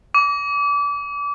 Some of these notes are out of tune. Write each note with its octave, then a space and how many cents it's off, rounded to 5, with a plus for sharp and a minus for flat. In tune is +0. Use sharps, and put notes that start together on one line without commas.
D6 -30